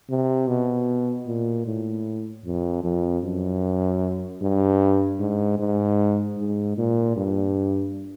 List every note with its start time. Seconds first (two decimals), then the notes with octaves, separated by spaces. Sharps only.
0.10 C3
0.48 B2
1.27 A#2
1.67 A2
2.45 F2
2.84 F2
3.24 F#2
4.42 G2
5.19 G#2
5.59 G#2
6.38 G#2
6.77 A#2
7.17 G2